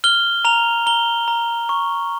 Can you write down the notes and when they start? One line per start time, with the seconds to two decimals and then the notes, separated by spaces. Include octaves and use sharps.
0.04 F6 G7
0.45 A#5 F7
0.86 A#5 G7
1.28 A#5
1.69 C#6